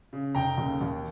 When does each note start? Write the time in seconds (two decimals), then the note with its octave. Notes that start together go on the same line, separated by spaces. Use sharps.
0.13 C#3
0.35 F1 G5 A#5
0.58 D#2 C#3
0.81 D#2